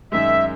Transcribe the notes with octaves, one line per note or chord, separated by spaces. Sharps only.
F#2 D#3 G#3 E5